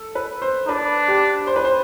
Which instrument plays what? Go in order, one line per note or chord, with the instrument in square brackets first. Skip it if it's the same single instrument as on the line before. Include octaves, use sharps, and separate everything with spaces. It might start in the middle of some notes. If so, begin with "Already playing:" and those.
Already playing: [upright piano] A4
B4
C5
[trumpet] D4 [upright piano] B4
[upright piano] G4
C5
B4
C5